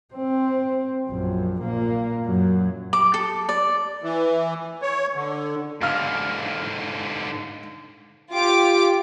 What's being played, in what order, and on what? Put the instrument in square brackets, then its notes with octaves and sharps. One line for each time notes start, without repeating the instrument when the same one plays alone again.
[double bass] C4
A#1 F#2
A#2 A#3
F#2 F#3
[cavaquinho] D6
A4
D5
[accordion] E3
C#5
D3
[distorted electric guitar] G#2 D3 [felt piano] F5 F6
[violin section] F4 G4 D6